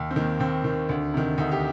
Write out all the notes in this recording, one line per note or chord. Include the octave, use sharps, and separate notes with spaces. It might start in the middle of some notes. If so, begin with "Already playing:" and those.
Already playing: D#2
C4
D#3 A#3
D#2 C4
D#3
D2 D4
C3 D#3
D2 D#4
G4